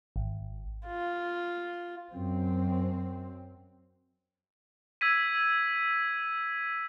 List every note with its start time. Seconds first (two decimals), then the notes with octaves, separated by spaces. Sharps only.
0.16 G#1
0.87 F4
2.13 F#2 C4
5.01 E6 G#6 B6 D#7